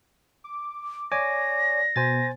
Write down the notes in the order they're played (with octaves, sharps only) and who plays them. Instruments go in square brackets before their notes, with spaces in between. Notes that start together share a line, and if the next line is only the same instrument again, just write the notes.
[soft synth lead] D6
[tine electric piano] C#5 G#5 D6 [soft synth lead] D5 [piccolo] A#6
[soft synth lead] B2 [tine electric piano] C5 G#5 A6